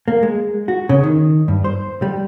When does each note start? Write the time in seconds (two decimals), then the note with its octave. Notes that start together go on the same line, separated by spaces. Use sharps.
0.08 A#3
0.23 G#3
0.68 F#4
0.89 C#3
1.04 D#3
1.48 G2
1.64 C5
2.02 G3